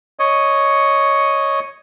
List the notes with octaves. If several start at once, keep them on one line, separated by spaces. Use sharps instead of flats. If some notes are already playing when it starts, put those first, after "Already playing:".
C#5 D#5